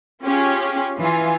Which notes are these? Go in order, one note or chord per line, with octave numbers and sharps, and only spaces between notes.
C#4 F4 G4 G#4
E3 F4 G#5